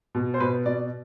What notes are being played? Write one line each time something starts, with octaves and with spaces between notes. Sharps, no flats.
B2
C5
B2 B4
B2 D5